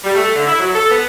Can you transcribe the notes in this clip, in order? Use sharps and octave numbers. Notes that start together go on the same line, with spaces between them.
G3
A3
D3
E4
F#3
A4
B3